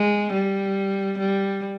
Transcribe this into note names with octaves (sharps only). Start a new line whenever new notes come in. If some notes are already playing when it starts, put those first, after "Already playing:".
Already playing: G#3
G3
G3